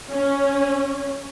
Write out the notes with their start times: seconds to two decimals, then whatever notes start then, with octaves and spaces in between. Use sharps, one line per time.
0.10 C#4